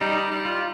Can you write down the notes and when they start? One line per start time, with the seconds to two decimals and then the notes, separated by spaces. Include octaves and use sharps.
0.01 G3 D#4
0.31 G3
0.45 F4